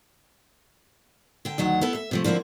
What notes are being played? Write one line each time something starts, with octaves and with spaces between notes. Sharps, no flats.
D3 G5
D2 D#3 F#3 F#5
B3 E4 A4
E5
C3 F3 A3
D3 F3 A#3 C4 E4